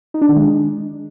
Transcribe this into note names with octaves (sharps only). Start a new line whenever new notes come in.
D#4
D4
D#3
G#3